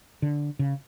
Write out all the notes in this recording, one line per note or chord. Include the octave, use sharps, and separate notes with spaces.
D3
C#3